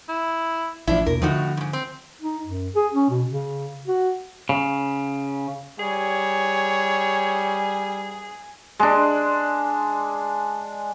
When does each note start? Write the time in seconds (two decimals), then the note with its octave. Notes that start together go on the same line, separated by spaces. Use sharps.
0.09 E4
0.87 A1 F3 D4 E4
1.06 D#2 B2 A#4
1.22 A2 D3 F3 D#4 F#4
1.57 F2 G#2
1.73 C4
2.22 D#4
2.45 F#2
2.75 G#4
2.94 C#4
3.10 B2
3.29 C#3
3.87 F#4
4.49 C#3
5.79 G3 G#4 C#5 G#5
8.79 G#3 D4